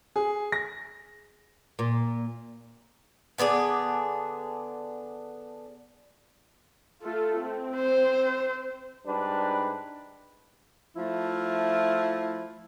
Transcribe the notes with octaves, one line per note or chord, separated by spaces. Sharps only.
G#4
A#6
A#2
D3 B3 D4 G#4
A3 F4 A4
C4
C5
G#2 G3 D4 B4
F3 A3 E4 F4